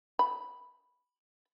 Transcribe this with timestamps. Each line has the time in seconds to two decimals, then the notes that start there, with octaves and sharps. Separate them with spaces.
0.19 B5